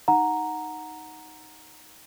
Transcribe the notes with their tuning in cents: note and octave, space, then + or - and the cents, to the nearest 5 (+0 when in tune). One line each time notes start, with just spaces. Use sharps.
D#4 +0 F#5 -15 A#5 +0